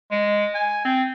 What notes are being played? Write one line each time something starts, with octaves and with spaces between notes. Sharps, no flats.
G#3
G#5
C4